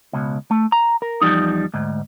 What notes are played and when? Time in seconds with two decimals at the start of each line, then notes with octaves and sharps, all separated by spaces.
0.13 C#2 B2
0.51 A3
0.72 A#5
1.02 A#4
1.21 E2 F3 G3 D#4
1.74 D2 G#2